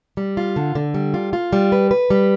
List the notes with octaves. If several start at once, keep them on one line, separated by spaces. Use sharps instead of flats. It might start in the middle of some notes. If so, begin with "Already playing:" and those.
G3
F4
D3
D3
G3
F4
F4
G3
B4
B4
G3